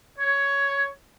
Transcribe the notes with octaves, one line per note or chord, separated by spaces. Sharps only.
C#5